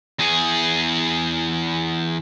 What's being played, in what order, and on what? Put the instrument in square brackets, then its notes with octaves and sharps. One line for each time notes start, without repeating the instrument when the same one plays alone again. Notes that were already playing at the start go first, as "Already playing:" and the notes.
[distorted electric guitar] E2 G#4